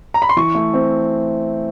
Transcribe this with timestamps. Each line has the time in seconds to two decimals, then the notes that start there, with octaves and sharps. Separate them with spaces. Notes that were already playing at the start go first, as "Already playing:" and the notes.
0.14 A#5
0.22 B5
0.29 C6
0.37 E3 C#6
0.55 A3
0.74 C4